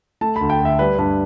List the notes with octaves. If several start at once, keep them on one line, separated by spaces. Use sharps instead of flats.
A3 A5
D2 B5
G5
D2
E5
G3 B4
G2 B4